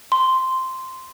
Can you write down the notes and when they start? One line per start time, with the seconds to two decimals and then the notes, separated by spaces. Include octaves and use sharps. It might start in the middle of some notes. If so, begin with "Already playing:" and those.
0.12 C6